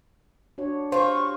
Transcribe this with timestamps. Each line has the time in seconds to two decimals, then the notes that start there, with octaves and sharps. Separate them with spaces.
0.58 D4 F#4 C#5
0.92 F4 G4 C5 C#6